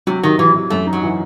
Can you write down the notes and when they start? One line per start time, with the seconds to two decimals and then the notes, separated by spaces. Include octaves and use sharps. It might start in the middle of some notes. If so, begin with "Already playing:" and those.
0.07 C3 F#3
0.23 C3 D#3
0.39 C3 E3
0.54 C3
0.70 F#2 A3
0.87 D#4
0.93 F#3
1.03 E3